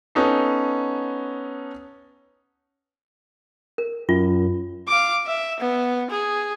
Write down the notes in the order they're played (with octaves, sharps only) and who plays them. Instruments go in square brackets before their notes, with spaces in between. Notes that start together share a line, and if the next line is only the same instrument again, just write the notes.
[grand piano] B3 C#4 D#4 A4
[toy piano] A#4
[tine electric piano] F#2 [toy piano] F4
[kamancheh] F5 D6
E5
B3
G#4